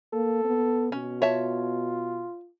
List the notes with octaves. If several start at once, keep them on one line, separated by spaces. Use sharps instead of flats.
A#3 A4
B3
B2 C#4
F4 C#5 E5 A5